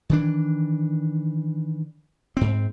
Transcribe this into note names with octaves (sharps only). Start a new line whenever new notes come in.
D#3 E3 D4
G#2 C4